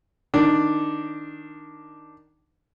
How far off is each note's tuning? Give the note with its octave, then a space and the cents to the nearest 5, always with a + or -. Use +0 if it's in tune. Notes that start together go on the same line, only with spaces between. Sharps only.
D#3 +0 D4 +0